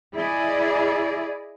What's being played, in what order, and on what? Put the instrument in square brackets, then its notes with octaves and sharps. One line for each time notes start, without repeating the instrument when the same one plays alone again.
[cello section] E4 G#4 D5 D#5